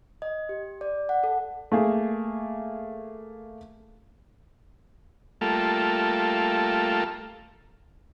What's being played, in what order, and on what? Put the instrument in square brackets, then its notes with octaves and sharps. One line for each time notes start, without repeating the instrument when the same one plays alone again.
[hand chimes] D#5
G4
D5
F#5
A4
[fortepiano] A3 A#3 G#4
[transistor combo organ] G3 A3 A#3 F4 A4